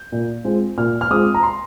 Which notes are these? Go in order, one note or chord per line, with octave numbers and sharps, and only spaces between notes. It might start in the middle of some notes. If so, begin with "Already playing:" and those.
Already playing: G6
A#2
G#3 C4 F4
A#2 F6
F6
G#3 C4 F4 D#6
A#5
C6